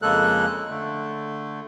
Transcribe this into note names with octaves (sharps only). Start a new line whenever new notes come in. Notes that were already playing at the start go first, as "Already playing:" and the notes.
F2 C#3 G#3 A#3 A4 F#6
D3 A3